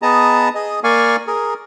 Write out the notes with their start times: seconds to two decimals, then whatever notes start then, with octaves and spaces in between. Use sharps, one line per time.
0.02 B3 G#4 D#5 A5 A#5
0.55 G#4 D#5
0.84 A#3 D5 F5 G#5 C#6
1.27 G#4 A#4